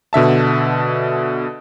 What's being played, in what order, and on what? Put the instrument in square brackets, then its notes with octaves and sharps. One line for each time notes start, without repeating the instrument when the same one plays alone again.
[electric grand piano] B2 D3 E5 A5